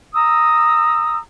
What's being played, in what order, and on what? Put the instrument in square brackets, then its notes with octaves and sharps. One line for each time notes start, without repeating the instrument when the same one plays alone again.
[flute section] A#5 D#6 E6